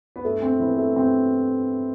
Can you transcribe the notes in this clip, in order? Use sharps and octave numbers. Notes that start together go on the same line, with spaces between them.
B3
G2 A3
C4
E3 B3
A3
G2 C4